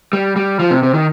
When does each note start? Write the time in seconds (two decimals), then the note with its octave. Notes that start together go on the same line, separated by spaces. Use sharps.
0.13 G3
0.36 G3
0.60 F3
0.71 C3
0.83 C3
0.94 D#3